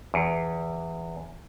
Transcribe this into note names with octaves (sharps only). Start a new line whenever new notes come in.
E2